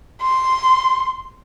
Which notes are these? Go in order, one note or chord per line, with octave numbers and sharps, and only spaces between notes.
C6